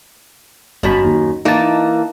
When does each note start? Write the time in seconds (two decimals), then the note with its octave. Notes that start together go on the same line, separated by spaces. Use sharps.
0.83 G1 F#2 D#3 A5 B5
1.05 D#2
1.45 E3 A#3 D#4 A5